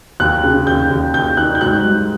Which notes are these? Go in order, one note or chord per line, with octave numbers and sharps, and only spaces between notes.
D#2 F#6
C#3
D#2 G6
D#2
D#2 G6
D#3 F#6
G6
G#2 F#6
G3